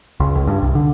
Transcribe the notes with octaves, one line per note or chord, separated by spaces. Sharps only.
C#2
C#2
G2
C2
D3